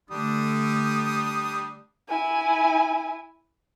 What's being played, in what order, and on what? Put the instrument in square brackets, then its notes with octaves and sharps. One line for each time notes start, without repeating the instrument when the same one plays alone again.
[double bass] D3 A3 [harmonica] G3 D4 D#6
[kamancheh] E4 G#5